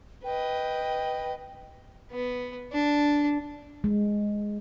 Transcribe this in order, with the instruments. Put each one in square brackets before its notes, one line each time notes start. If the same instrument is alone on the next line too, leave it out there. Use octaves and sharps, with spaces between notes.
[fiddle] B4 D#5 [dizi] G5
[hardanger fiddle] B3
D4
[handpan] G#3